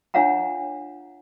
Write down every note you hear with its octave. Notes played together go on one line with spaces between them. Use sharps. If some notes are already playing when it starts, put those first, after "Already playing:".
D4 F4 C#5 F5 F#5 A#5